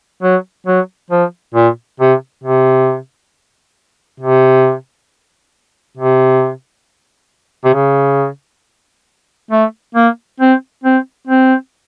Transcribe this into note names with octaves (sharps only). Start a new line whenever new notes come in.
F#3
F#3
F3
A#2
C3
C3
C3
C3
C3
C#3
A3
A#3
C4
C4
C4